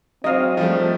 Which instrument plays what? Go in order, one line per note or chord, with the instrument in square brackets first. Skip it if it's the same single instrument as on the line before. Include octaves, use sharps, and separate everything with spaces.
[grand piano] F#3 [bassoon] G#3 [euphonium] C4 [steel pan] D#5 F5
[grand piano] F3 G3 A3